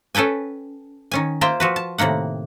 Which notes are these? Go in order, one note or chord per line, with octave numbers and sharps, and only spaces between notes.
C#4 A4 B4 G5 G#5
D#3 C#4 G#5
A#3 F4 C5 E5 G5
F3 F#4 B4
A5
A2 C3 D#3 A#3 F#5